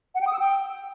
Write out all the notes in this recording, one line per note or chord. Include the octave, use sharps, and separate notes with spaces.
F#5
G5
D#6
E6
G5